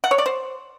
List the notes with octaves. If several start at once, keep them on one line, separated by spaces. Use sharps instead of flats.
F#5
C#5
D5
C5